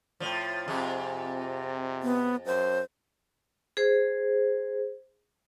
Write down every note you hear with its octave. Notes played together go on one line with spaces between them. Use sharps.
A2 F3
F2 C3 G#4
B3
F#2 C5
G#4 C5